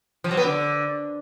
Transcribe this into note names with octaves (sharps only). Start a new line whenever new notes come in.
F3
F#3
B3
D3